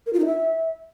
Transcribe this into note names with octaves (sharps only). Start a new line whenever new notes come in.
A#4
F4
D#4
E5